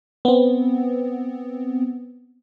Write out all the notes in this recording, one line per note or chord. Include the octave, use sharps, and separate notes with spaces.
B3 C4